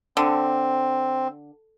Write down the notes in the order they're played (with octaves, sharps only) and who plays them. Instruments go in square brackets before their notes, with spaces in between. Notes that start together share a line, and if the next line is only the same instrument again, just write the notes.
[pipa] D3 [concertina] C4